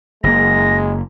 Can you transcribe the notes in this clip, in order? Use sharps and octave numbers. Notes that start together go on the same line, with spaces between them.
F#1 G#3 A#3 A#6